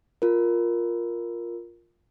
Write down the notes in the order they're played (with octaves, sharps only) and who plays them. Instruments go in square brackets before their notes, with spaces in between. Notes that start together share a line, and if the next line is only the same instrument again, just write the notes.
[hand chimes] F4 A#4